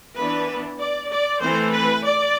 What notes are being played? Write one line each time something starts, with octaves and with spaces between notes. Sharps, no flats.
E3 B3 D4 B4
D5
D5
E3 A3 C4 C5
B4
D5